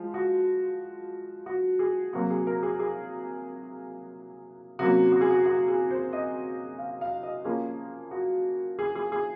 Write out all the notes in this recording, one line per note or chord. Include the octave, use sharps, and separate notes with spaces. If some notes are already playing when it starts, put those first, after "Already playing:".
Already playing: F3 G#3 F4
F#4
F#4
G#4
C3 F#3 A#3 F#4
G#4
A#4
G#4
G#4
C3 F#3 A#3 C#4 F#4
F#4
G#4
F#4
F#4
G#4
C5
D#5
F5
F5
D#5
F3 A#3 C#4 G#4
F#4
G#4
G#4
G#4